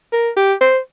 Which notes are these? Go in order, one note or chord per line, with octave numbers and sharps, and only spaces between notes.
A#4
G4
C5